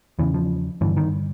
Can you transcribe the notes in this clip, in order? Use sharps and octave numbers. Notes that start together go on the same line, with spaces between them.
E2 C#3 E3
F3
G2 D3 E3
D#3